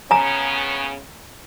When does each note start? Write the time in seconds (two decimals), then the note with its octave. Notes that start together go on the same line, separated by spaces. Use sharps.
0.11 C#3 B3 C#4 G#5 A#5